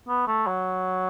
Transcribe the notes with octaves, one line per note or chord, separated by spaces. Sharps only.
B3
A3
F#3